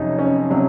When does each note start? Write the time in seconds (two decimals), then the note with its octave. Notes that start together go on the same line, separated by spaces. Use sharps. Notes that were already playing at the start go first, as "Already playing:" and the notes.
Already playing: F2 C3 F#3 C#4 D#4
0.19 C#4
0.50 C3 F#3 C#4